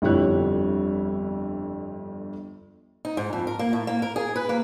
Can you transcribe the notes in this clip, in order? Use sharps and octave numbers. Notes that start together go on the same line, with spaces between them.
G1 F2 G3 E4 C#5 F#6
D#4
G#2
F2
A#4
A#3
A2
A#3
A#4
G#4
B4
A#3